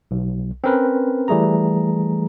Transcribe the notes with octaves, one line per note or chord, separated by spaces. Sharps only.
B1
C4 C#4 A#4 B4
E3 G3 A3 G#4 A#5